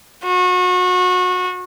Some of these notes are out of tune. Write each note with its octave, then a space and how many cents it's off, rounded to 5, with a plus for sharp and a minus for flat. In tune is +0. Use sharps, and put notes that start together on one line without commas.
F#4 -30